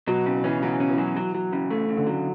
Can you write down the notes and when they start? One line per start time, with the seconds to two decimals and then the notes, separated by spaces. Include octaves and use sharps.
0.07 B2 F#3
0.26 C#3
0.44 E3 C#4
0.62 C#3 F#3
0.80 C#4
0.89 E3
0.98 F#3
1.16 F#3
1.35 F#3
1.53 C#3
1.71 A3
1.89 C#3
1.97 D3
2.07 F#3